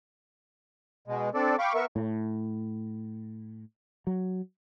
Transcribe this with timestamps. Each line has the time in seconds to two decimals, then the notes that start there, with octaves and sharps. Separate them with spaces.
1.08 B2 G#3
1.34 C4 D4 A4 D5
1.59 F5 G5 B5 C#6 D6
1.75 B3 A#4 E5 C#6
1.96 A2
4.07 F#3